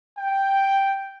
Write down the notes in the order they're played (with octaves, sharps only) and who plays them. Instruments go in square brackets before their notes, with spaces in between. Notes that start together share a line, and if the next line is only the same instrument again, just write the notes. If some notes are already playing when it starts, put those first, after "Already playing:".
[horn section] G5